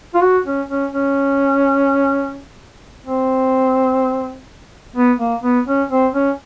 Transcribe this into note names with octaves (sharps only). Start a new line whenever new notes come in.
F4
F#4
C#4
C#4
C#4
C4
B3
A#3
B3
C#4
C4
C#4